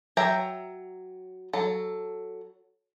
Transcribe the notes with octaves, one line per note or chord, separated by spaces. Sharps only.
F#3 C#5 E5 G5 A#5
F#3 A4